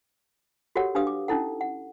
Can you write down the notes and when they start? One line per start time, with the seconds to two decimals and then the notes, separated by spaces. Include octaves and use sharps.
0.76 F#4 G4 A4 A#4 C#5 F#5
0.95 D4 G4 B4 F5 D#6
1.07 D6
1.28 C#4 D#4 E4 A4 F#5
1.61 F#5